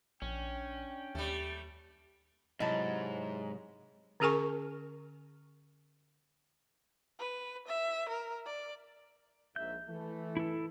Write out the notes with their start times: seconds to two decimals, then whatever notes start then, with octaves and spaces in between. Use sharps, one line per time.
0.22 A#1 C#4 D4 G5
1.15 D#2 G3 A3
2.60 G#2 C3 F#3 E4 C#5 D#5 A5
4.20 D3 C#4 G#4 A#4 G#5 C#6
7.19 B4
7.67 E5
8.09 A#4
8.45 D5
9.56 A#1 G#2 E5 G6
9.88 E3 A3
10.37 E4 A4